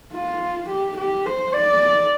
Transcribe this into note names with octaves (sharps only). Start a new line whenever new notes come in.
F4
G4
G4
C5
D5